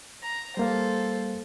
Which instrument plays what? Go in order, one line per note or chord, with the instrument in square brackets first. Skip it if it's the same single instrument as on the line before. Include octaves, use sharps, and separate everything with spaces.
[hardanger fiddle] A#5
[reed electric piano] G3 A#3 F5 [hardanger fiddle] A4 C5